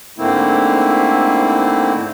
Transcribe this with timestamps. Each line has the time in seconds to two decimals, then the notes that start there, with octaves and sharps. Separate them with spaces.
0.19 G#2 D3 A3 A#3 C4 E4